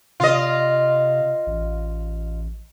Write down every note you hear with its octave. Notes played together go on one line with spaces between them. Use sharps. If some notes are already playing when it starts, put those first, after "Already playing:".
C3 F4 D#5
A1